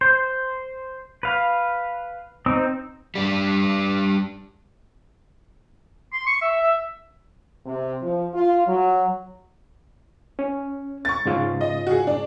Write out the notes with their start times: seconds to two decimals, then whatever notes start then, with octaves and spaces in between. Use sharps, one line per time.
0.01 C5
1.23 B4 F5
2.46 C4 D#4 E6
3.15 G3 D4
6.13 C6
6.26 C#6
6.42 E5
6.61 E5
7.66 C3
8.02 F3
8.34 F4
8.67 F#3
10.39 C#4
11.05 C#6 A6
11.26 G#2 C#3 F4
11.61 D#5
11.87 F#4 G#4
12.07 D4